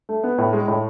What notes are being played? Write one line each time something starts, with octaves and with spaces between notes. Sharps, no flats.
A3
B3
A2
G#3
A2